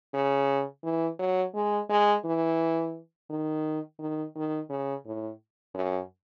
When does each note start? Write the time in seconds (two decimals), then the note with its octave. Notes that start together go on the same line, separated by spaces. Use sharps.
0.14 C#3
0.83 E3
1.19 F#3
1.54 G#3
1.89 G#3
2.25 E3
3.30 D#3
3.99 D#3
4.36 D#3
4.70 C#3
5.06 A2
5.75 F#2